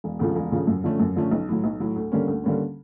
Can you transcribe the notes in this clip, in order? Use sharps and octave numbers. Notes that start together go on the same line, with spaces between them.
E1
D2 C#3 F3
E1
D2 C#3 F3
F#2
D3 F3 A3 C#4
F#2
D3 F3 A3 C#4
B1
A2 F#3
B1
A2 F#3
D2
D3 G3 A#3 C#4
D2
D3 G3 A#3 C#4